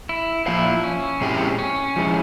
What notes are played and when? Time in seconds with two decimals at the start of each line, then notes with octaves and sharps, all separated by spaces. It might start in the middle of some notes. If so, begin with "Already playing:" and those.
0.09 E4
0.46 F3 A#3 E4 F4 C5 F5
0.84 C#4
1.21 A#2 G#3 C4 E4 G4
1.59 C#4
1.96 F3 G#3 E4